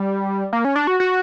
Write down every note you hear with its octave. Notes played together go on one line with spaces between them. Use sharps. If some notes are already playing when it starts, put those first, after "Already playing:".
Already playing: G3
A#3
C#4
D4
F#4
F#4